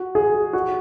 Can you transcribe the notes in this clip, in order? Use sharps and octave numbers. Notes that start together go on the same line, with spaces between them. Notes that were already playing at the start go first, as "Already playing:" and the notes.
Already playing: F#4
G#4
F#4